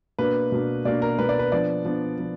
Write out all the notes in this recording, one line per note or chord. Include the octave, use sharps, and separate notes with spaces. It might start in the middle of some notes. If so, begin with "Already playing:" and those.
B2 A#3 D4 B4
B2 A#3 D4
B2 A#3 D4 D5
A#4
B2 A#3 D4 B4
D5
B4
F3 B3 D4 D5
F3 B3 D4
F3 B3